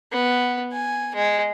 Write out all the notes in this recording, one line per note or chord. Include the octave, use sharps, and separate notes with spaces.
B3
G#5
G#3